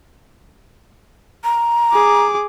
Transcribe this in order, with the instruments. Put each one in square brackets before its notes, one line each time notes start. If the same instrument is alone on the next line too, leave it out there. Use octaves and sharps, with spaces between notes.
[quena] A#5
[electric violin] G#4 D6